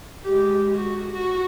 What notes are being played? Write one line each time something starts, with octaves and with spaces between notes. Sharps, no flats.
G#3 G4
F#4
F#4